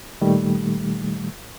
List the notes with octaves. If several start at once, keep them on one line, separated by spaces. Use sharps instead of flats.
A#2 D#3 G3 A3